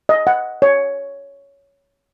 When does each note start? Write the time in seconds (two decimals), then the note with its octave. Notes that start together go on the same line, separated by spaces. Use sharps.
0.09 D#5
0.27 F#5
0.62 C#5